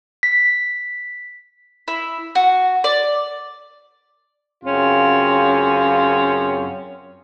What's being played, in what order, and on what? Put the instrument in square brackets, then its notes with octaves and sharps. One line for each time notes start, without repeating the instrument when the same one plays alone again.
[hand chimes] B6
[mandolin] E4
F#4
D5
[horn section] F#2 C#3 C4 C#4 F4